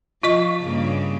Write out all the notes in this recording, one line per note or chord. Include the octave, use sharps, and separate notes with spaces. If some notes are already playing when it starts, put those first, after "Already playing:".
F3 F4 D#5 C#6
G2 C#3 A#3